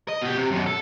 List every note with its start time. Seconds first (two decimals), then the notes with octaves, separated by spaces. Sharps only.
0.08 D#5
0.22 B2 G4
0.37 C3
0.51 F#2 B2
0.66 A4